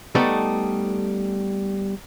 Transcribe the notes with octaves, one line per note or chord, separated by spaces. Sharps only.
G3 A3 B3 D#4 A4 B4